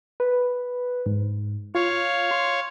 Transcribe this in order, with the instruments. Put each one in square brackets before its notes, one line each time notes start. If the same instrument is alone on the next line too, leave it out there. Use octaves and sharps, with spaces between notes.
[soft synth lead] B4
G#2
[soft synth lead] F4 [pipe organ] C#5 F5
[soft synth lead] C6